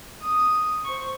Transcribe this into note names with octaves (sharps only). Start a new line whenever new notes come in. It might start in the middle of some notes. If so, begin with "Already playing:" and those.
D#6
C5 C#6